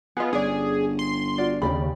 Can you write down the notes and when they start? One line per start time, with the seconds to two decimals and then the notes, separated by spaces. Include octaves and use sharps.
0.17 B3 F4 G#4 D#5
0.33 G1 C#4 D4 G#4 D5
0.99 C6
1.38 F4 F#4 D5
1.62 D#2 C#3 G4 D5 B5